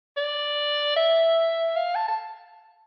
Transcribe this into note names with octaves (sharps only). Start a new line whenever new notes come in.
D5
E5
F5
A5
A5